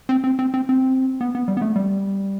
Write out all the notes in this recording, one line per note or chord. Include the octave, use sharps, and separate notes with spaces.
C4
C4
C4
C4
C4
B3
B3
G3
B3
A3
G3